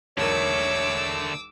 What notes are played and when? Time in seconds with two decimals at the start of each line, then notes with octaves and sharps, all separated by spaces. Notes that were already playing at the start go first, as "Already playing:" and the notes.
0.18 E1 B1 D3 A3 A#4 C#5 D6 E6